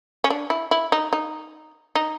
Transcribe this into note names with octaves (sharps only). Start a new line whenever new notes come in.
C#4
D4
E4
E4
D#4
D#4
D#4